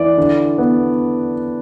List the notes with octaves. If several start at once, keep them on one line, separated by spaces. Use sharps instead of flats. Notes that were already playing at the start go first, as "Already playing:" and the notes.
Already playing: E3 D5
D3
B3